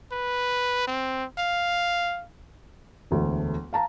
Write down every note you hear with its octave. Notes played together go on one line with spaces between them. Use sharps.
B4
C4
F5
E1 D2 A3
F5 A5 A#5